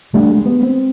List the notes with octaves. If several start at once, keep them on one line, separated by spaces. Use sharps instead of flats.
E3 G3 A3 D4
G#3
B3
C4